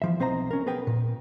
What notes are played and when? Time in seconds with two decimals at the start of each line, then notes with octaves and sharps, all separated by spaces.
0.02 E3 F3 E5
0.20 B1 C4 C5 D#5 F5 A#5
0.51 C#4 A#4
0.66 B3 G#4 A#4 B4 G5
0.87 A#2